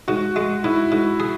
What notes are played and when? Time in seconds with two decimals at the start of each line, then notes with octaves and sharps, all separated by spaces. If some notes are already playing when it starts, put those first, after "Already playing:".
0.08 G#2 F#4
0.36 G#3
0.64 G#2 E4
0.92 G#2
1.20 G#4